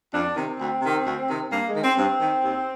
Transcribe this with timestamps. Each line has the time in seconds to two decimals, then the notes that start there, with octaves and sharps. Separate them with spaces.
0.13 F2 D4
0.36 C3 D#3 C4
0.60 D2
0.82 C3 D#3
1.06 D2
1.30 C3 D#3
1.52 G2 A#3
1.68 G#3
1.76 D#3
1.84 C4
1.98 G2 C4
2.21 D#3
2.44 D#2